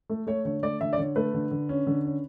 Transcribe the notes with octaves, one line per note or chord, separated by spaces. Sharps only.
A3
A3 C#5
D3 C#5
A3 D5
D3 E5
D5
D3 C#5
A3 B4
D3
D3
C#4
D3
C#4